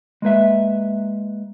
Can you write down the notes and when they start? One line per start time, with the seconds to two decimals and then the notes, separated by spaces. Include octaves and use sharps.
0.22 G#3 A#3 B4 E5